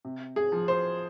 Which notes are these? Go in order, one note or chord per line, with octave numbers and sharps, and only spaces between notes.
C3
G#4
F3
C5